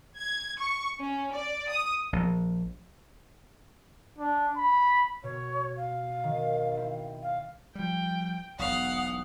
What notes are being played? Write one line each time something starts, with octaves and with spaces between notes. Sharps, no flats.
G#6
C#6
C#4
D5
D#6
A#1
D4
B5
B2 C#5
F5
D#3
C4 E4
F5
F3 G3 G5
E1 B1 F5 F#5 D#6